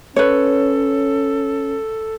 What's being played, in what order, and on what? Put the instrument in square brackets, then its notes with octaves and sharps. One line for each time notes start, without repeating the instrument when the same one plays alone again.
[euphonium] C#4 [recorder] A4 [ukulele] B4 C#5